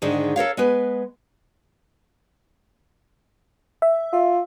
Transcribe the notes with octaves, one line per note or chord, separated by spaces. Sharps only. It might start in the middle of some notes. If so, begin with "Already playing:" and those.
G#2 D3 D#3 G#3
A4 A#4 C#5 F5
G#3 B3 B4
E5
F4 E5